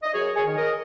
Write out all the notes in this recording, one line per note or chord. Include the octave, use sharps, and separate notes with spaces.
D#5
F#2 G#4 C#5
G#4 C#5
D#3
A#4 D#5